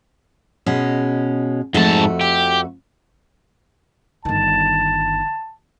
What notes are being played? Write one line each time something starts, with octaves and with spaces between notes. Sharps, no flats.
B2 G#3 C#4
F2 G#2 A3 F#4 A5
G4
G1 D#3 A5